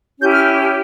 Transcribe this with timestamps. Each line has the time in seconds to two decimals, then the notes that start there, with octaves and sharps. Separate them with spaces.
0.20 C#4 E4 G4 G6
0.31 F6